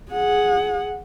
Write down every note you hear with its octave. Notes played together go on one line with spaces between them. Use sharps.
G#4 F#5